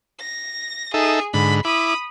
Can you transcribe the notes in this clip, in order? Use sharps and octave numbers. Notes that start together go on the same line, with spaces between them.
A#6
D#4 G#4 A4 E5
G#2 D3 B5
E4 B5 D6 D#6